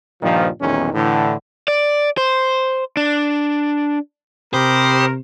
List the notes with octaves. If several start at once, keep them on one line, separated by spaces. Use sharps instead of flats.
G2 A#2 D#3 F3
B1 E2 A#2 D#3 G#3 C#4
A2 D3 E3
D5
C5
D4
C3 G4 A#4 C5 B5 D#6